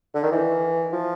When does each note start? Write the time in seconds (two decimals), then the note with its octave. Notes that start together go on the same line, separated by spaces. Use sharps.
0.15 D3
0.23 D#3
0.32 E3
0.93 F3